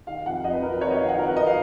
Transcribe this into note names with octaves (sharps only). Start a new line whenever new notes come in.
D#3 F5
F2 F#5
F2 D#5
B4
D#3 A#4
B4
F2 C#5
D#5
D#3 F5
F#5
F2 A#4
B4
D#3 D#5
F5